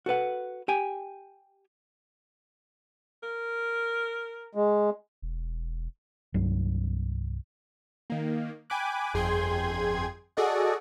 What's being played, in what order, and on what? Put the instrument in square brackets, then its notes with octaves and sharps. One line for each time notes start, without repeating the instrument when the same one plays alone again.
[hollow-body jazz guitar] F#4 A4 B4 F#5
G4 G5 G#5
[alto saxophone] A#4
[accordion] G#3
[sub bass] E1
[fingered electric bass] C2 G2 F#3
[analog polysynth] D#3 A#3
G5 G#5 B5 D6 F#6
G1 F2 G#4 G5 C6 G#6
F#4 G#4 A4 D5 D#5 F#5